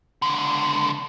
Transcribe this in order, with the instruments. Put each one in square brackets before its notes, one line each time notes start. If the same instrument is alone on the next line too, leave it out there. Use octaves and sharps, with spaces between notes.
[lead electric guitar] C#2 D3